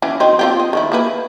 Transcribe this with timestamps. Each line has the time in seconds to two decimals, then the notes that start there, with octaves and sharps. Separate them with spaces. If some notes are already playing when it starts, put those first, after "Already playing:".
0.02 E3 C#4
0.20 F#3 C4 D#4
0.39 C4 F4 G4
0.60 D#5
0.73 D#3 F3 E4
0.92 A#3 E4 B4